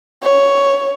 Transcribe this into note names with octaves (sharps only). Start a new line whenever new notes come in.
C#5